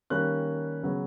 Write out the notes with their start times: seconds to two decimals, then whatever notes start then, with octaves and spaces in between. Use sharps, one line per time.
0.10 D#3 G3 A#3 C#4 F#6
0.83 C#3 F#3 B3